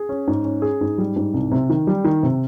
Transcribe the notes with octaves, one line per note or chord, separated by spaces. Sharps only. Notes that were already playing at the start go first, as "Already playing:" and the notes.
Already playing: G#4
C#4
G#2
C#4
G#4
G#2
G3
G#2
C2
C3
D#3
G3
D#3
C3